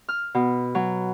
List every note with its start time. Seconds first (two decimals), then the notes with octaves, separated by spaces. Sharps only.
0.09 F6
0.35 B2
0.75 F#3